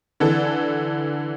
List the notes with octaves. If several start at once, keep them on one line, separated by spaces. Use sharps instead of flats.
D3 E3 A4